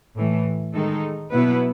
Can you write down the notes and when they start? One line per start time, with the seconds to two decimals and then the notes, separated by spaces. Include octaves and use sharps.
0.15 A2 E3 A3
0.74 D#3 G#3 D#4 A4
1.32 B2 F#3 B3 E4 B4